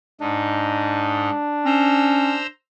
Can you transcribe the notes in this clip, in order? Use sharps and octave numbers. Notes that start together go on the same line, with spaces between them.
G#2 D4 D#4
C#4 C5 A#5 E6